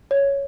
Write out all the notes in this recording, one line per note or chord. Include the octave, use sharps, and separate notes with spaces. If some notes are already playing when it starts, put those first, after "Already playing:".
C#5